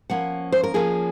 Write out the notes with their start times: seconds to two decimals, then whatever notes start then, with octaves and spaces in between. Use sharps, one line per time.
0.10 F3 A#3 C#4 F#5
0.52 C5
0.63 A#4
0.74 F3 A#3 C#4 G#4